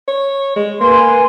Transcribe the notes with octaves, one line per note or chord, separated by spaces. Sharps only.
C#5
G#3
A#3 B4 G#5 C6